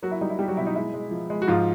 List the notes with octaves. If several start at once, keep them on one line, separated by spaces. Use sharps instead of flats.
F#3 A#3 F#4
E4
G3 D#4
E4
G3 G4
F#3 F#4
B2 E4
D#4
G#3 E4
G#3
F3
G#3
F#4
G#2 F3 F4